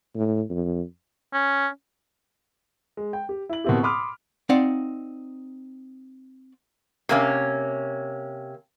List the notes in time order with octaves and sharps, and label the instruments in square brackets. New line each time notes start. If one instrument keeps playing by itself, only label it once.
[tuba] A2
F2
[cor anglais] C#4
[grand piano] G#3
G5
G4
E4 F#7
B2 A#3 C4 E4 G4
B5 C6 D6 D#6 F6
[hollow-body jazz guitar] C4 D#4 D5 F5 F#5
[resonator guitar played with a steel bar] C3 A#3 C#4